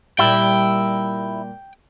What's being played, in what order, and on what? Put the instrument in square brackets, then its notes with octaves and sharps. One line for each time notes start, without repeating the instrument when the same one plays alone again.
[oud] A#2 G3 [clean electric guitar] E4 [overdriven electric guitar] G5